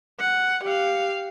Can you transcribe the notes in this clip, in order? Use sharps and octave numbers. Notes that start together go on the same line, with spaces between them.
F#5
G4 F5